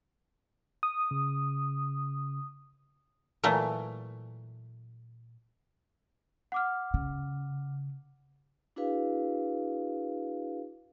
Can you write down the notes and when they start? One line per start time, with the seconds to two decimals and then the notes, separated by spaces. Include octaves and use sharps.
0.83 D#6
1.11 C#3
3.44 A#2 E3 F#3 A3
6.52 F#5 D6 F6
6.94 C#3
8.76 D4 E4 F#4 G#4 B4 F5